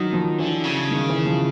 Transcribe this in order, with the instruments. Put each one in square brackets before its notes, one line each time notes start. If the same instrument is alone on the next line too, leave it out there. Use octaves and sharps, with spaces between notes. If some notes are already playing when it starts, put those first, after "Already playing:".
Already playing: [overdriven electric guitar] D#3 [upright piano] F#3
[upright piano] F3
[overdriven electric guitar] D3 [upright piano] E3
[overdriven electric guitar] C#3
[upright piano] D#3
E3
F3